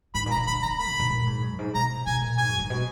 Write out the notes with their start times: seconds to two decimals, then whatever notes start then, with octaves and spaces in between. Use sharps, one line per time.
0.15 G#2 B5
0.26 A#2
0.31 A#5
0.37 B2
0.47 D3 B5
0.62 B3 A#5
0.79 A#3 B5
0.89 D3
1.00 B2
1.10 A#2
1.26 G#2
1.42 F#2
1.59 G#2
1.74 B2 A#5
2.06 B2 G#5
2.21 A#2
2.37 G#2 G#5
2.49 F#2
2.59 G#2
2.70 B2